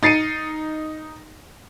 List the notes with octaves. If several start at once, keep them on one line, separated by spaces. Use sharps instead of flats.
D#4 A6 C7 C#7 D#7